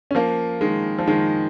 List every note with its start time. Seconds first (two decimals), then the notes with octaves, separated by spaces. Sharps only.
0.11 C#4
0.15 F3 A#3
0.61 D#3 G#3
0.99 F3
1.08 D#3 G#3